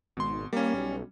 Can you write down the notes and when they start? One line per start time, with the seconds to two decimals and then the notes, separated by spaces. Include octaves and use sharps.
0.17 G#1 B2 C6
0.53 G3 A#3 C#4
0.74 B1